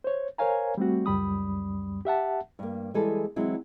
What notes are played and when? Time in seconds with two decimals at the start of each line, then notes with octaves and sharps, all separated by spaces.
0.04 C5 C#5
0.38 A#4 C5 C#5 F5 G#5 A#5
0.77 G3 A3 C4 F#4
1.06 C#2 F#2 G3 B5 D#6
2.05 G4 E5 F#5 A5
2.59 G2 A#3
2.94 E3 G3 G#3 B3 G#4 A4
3.36 E3 F#3 G#3 C4 E4